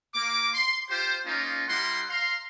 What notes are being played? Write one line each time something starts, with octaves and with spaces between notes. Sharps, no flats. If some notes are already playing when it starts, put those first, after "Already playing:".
A#3 D6
C6
F4 G4 C5
A#3 C#4 D#4 F4
G3 E4 A#4 F#5 C6
F5 A#5 C6